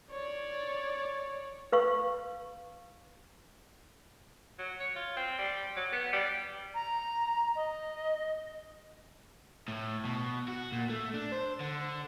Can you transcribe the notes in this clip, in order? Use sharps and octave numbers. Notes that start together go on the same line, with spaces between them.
C#5 D5
B4 F5 C#6
F#3
C#5
F4
C4
G3
F#3
B3
G3
A#5
D#5
A2
B2
F#4
A#2
A3
D4
C5
D3